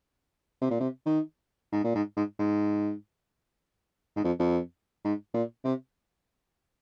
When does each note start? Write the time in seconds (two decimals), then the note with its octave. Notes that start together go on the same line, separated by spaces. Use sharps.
0.62 C3
0.71 A#2
0.80 C3
1.06 D#3
1.73 G#2
1.84 A#2
1.95 G#2
2.17 G#2
2.39 G#2
4.16 G#2
4.24 F2
4.39 F2
5.05 G#2
5.34 A#2
5.64 C3